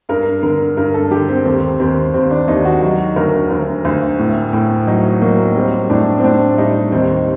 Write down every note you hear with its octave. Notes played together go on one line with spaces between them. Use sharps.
G2 A#4
D3 A#4
G2 A#4
A4
D3 G4
C4
D#2 C4
D#2 C4
D#2 C4
D4
D#2 D#4
F#4
F#3 F#4
D2 A#4
D2
D2
A2
A2
F#3 D#4
F#3 A#3
G3 C4
A2 D4
C4
A2 D4
G3 D#4
D#2 C4